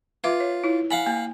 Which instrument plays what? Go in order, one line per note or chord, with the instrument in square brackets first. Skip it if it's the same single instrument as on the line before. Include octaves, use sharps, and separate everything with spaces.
[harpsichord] F4 [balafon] B4 E5 D6
[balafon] C#5
E4 C#5
[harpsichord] F5 F#5 B5 [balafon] G#5
[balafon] A#3 G#5